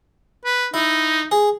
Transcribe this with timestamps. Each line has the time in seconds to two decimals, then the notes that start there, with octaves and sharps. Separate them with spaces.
0.45 B4
0.74 D#4 E4
1.31 G#4